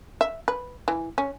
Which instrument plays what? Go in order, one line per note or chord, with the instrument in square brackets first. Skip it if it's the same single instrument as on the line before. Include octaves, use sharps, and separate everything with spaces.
[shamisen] E5
B4
E3
C#4